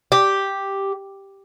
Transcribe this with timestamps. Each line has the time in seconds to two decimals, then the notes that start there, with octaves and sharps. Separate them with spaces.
0.12 G4